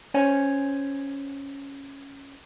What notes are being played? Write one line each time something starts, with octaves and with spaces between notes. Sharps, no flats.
C#4 C5 C#5 G#5